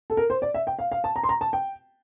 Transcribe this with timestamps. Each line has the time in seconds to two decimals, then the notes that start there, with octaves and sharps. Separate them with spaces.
0.10 A4
0.17 A#4
0.30 C5
0.42 D5
0.54 E5
0.67 G5
0.79 F5
0.92 F5
1.04 A5
1.16 A#5
1.24 C6
1.29 A#5
1.41 A5
1.53 G5